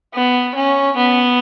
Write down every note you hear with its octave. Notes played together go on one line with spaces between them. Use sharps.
B3
C#4
B3